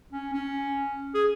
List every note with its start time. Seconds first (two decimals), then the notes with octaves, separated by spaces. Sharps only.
0.13 C#4
0.33 C#4
1.15 G#4